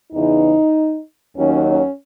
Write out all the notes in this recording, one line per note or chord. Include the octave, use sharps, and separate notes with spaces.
E2 C#3 E3 D#4
D#2 D#3 F#3 C#4
C#4